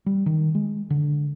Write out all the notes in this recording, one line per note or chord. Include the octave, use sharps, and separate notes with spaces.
G3
D#3
G#3
D3